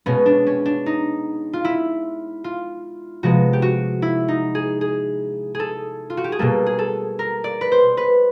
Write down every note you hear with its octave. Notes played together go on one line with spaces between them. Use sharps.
B2 G#3 B3 C#4
D4
C#4
D4
D#4
F4
E4
F4
C3 F3 G#3 B3 F#4
G4
F#4
E4
D#4
G#4
G#4
G#4 A4
F4
F#4
G4
G#4
B2 G3 A#3 A4
G#4
A4
A#4
D5
B4
C5
B4